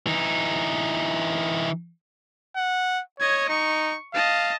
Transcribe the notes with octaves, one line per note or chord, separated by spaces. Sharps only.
E3 D#4
F#5
C#5 D#5 G#6
D#4 C#6
D#5 F5 A5